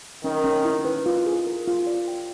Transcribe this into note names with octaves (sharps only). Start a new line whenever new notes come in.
D#3 C#4
C#4
E4
B4
F4
G#4
A#4
F4
D5
G5